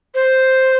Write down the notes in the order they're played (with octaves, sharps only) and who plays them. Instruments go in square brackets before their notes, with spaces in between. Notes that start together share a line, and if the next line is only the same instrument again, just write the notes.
[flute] C5